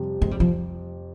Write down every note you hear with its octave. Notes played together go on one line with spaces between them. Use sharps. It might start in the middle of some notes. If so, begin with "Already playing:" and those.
Already playing: F2 C3 G3
F2 G#3
G3
F3